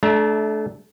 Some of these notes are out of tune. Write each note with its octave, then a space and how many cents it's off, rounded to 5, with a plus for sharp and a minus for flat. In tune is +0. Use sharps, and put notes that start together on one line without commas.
A3 -25 D4 +0 A#5 +25